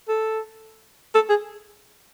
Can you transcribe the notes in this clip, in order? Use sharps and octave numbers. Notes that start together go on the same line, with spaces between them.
A4
A4
G#4